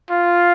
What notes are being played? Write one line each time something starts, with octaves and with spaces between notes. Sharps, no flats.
F4